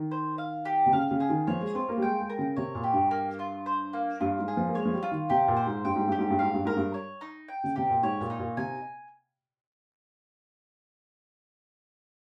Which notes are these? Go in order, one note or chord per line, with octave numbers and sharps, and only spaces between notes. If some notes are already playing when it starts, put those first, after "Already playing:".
Already playing: D#3
C5
F5
G4
C3
C#3 F5
C#3
G#4
D#3
F3 C#5
G#3
C4 F4
A#3
G3
G#3 G5
G#3
A#4
C#3
C3 C#5
A#2
G4
G2
A#3
F4
C5
A#3
G2 F4
G#2
G#4
F3
A#3
G#3 C#5
F3
G3
F4
D#3
C3 G4
A#2
C5
G#2
G2 G5
G#2
G2 G4
G#2
G2
G#2 F5
G2
G#2 A#4
G2
C#5
D#4
G5
C#3
C3 G4
A#2
G#2 C#5
A#2
D#4
A#2
C3 G#5